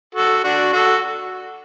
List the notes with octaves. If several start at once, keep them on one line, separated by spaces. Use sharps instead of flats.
F#4 A4
D4 F#4
F#4 A4